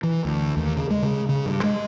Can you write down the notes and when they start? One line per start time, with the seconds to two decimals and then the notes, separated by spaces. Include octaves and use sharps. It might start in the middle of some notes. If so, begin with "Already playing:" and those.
0.03 E3
0.25 D2
0.57 D#2
0.76 C#3
0.90 G#3
1.03 C#3
1.29 C#3
1.46 G2
1.64 G#3